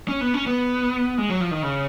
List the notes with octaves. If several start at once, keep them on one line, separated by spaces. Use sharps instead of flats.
C#4
B3
C#4
B3
G#3
F#3
F3
D#3
C#3